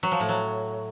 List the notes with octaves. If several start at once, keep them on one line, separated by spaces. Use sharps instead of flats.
F#3
F3
A2
F#3